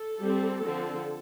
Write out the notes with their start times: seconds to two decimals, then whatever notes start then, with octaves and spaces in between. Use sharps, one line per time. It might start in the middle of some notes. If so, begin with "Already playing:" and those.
Already playing: A4
0.21 G3 C4
0.64 D3 F3 C4